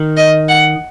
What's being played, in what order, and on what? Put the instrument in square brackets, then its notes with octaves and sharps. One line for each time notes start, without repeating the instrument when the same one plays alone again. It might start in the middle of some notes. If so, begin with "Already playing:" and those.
Already playing: [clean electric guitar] D#3
[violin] D#5
F#5